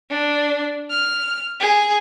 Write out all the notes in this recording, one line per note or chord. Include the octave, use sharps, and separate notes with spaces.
D4
F6
G#4